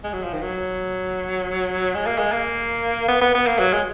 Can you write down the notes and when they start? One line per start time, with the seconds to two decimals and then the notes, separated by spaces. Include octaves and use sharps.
0.04 G#3
0.14 F#3
0.24 F3
0.33 D#3
0.42 F#3
1.95 G#3
2.06 A#3
2.19 G#3
2.32 A#3
3.08 B3
3.22 B3
3.35 B3
3.47 A#3
3.59 F#3
3.73 G#3